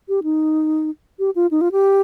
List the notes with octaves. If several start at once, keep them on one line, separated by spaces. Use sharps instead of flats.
G4
D#4
G4
F4
D#4
F4
G4